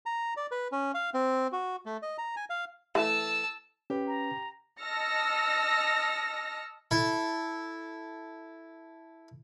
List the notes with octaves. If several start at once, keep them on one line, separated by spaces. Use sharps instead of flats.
A#5
D5
B4
C#4
F5
C4
F#4
A3
D#5
A#5
G#5
F5
E3 A3 A5 E6
C#4 G4 B4
A#5
D#5 A5 E6 F6 A#6 C#7
E4 A4